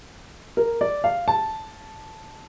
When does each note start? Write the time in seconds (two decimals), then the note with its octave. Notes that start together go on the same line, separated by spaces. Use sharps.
0.57 A#4
0.81 D5
1.04 F5
1.28 A5